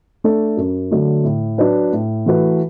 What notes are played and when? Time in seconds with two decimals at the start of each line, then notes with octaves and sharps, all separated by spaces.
0.24 A3 D4 A4
0.57 F#2
0.91 D3 F#3 A3
1.24 A2
1.58 F#3 D4 B4
1.92 A2
2.26 E3 A3 F#4 B4